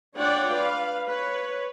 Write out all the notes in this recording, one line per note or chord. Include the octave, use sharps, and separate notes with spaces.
D4 F4 C#5 D5 F#5 G5
B4 F5
B4 C#5